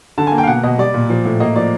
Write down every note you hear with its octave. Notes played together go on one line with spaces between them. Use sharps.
D3 A5
G#5
A#3
G5
F5
B2 F#5
B2 D#5
G3 D5
A#2
F3
A2
A#3 D#5
F3 D5